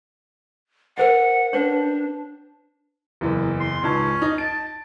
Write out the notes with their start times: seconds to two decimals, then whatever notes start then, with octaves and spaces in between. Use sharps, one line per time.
0.98 A#4 C5 D#5 F#5
1.53 C#4 D4 B4 C#5
3.21 F#1 E2
3.60 C6
3.83 C#2 G#2 C#4 A5
4.22 D#4
4.38 A5 D7